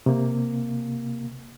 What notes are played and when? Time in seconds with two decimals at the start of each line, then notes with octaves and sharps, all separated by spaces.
0.06 C3 A#3